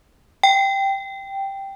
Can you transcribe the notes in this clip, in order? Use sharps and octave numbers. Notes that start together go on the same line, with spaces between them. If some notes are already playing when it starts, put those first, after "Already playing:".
G5